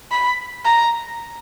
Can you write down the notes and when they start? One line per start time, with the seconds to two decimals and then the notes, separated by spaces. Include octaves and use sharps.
0.11 B5
0.65 A#5